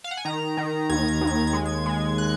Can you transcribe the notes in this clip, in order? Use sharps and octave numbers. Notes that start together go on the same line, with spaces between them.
F5
F#5
G#5
D#3 A#5
D#3
D#2 G#6
G#6
D#2
G#6
G#6
G#3
G#6
G#3
F#6